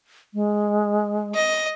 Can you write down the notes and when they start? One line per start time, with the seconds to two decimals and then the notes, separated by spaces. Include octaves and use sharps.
0.34 G#3
1.35 D#5